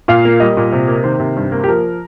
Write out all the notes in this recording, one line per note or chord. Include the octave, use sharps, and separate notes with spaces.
A#2 F5
A#3
G3 D#5
A#2
C3
A#3
D#3 C5
C3
G2
A#3
G4
F3 A#4